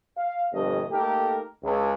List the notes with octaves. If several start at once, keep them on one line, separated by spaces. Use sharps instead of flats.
F5
G1 F2 A#2 A3 D#5
A3 A#3 D#4 G4 A4 A#4
C#2